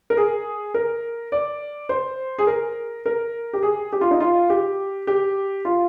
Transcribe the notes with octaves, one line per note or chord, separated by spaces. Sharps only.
A#4
G#4
A#4
D5
C5
G#4
A#4
A#4
G4
G#4
G4
F4
D#4
F4
G4
G4
F4